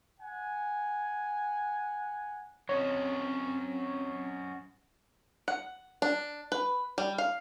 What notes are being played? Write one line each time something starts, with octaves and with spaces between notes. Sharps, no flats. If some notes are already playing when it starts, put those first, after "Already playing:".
F#5 G#5
F#3 C4 C#4 C#5 D#5
F#5
D4
B4
G3
F5